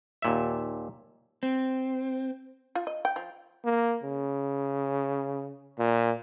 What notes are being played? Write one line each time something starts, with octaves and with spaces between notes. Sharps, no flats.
D#2 A#2 E5
C4
F4
D#5
G5
F3
A#3
C#3
A#2